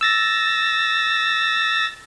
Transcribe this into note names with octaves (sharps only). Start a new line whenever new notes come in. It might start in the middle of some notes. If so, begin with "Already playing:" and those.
E6 A6 A#6